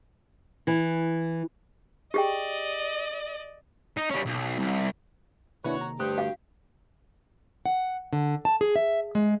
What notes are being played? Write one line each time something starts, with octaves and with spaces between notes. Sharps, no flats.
E3
G4 G#4 D5 D#5 G5
D#4
G3 C#4
B1
C2
C3 D#3 A#3 D4 E4 F#4 B4 C#5
A#5
G1 G2 D3 A3 G4 C5 D#6 F#6
F#4 F5 F#5
F#5
D3
A5
G#4
E5
G#3